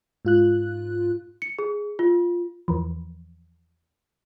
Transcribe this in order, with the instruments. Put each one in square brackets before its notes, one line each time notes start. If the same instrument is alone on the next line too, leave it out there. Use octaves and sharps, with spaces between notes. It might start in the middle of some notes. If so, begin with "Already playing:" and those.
[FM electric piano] G#2 F4 F#6
[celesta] C#7
G#4
F4
[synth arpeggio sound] E2 E3 F3